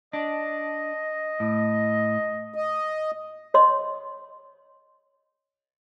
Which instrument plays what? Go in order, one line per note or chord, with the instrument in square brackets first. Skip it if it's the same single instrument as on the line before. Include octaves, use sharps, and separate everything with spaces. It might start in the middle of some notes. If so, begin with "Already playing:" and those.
[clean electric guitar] D4 [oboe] D#5
[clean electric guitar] A2
[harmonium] D#5
[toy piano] C#5 D#5 C6